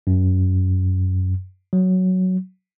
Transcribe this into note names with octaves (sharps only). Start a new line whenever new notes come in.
F#2
F#3